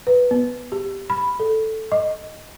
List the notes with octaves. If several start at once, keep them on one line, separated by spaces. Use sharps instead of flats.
B4
B3
G4
B5
A4
D#5